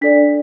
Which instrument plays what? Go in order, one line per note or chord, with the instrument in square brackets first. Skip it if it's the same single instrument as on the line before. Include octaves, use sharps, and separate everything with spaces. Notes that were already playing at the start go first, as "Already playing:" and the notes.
[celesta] D4 A4 D5 B6